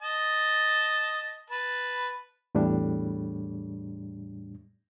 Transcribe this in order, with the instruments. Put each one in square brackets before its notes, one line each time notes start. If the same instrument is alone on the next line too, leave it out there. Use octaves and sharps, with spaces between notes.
[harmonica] D#5 A5
B4 A5
[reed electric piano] E2 A2 G3 D4